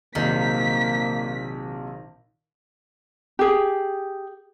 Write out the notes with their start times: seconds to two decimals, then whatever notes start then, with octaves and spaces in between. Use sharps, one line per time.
0.15 A#1 C3 D#3 F#3 A#3 B6
3.39 G4 G#4